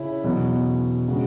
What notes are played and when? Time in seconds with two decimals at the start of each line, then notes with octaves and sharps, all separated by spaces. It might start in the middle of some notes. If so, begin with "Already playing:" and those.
Already playing: C#3 C#4 E4
0.24 E2 B2 F#3 B3
1.08 C#3 G#3 D4 F#4